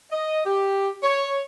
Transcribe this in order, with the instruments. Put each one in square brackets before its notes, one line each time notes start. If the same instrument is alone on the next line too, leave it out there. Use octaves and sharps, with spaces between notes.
[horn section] D#5
G4
C#5